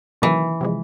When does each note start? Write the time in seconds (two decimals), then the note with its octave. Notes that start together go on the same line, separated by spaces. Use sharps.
0.22 C3 D#3 E3 F#3 A#3 C#4
0.61 C3 F3 G#3